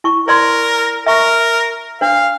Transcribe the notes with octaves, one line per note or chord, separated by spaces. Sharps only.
E4 C#6
A#4 C5 D5 C6
A#4 E5 C#6
D4 C5 F5